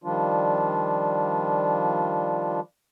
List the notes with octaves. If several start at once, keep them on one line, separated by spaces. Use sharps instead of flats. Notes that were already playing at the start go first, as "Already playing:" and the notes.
D#3 F3 G3 D4 F4